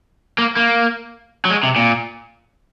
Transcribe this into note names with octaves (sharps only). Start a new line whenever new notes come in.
A#3
A#3
F#3
G#3
C3
A#2